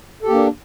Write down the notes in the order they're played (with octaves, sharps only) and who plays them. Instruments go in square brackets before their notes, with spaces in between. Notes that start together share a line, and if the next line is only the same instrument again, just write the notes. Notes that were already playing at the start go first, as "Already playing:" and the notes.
[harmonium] A4
G4
A#3
D4